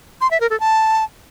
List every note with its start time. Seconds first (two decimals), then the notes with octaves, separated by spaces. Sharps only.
0.21 C6
0.31 E5
0.40 A#4
0.50 A4
0.60 A5